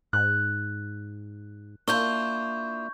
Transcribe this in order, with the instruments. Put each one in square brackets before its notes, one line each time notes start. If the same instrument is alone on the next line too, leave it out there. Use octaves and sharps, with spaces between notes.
[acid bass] G#2 [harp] F#6
[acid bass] A#3 [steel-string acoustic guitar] D4 E4 F4 [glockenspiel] C#6 G6